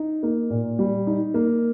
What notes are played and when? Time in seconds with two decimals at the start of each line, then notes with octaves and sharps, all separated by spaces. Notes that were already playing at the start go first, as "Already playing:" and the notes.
Already playing: D#4
0.23 A#3
0.50 A#2
0.79 G3
1.07 D#4
1.34 A#3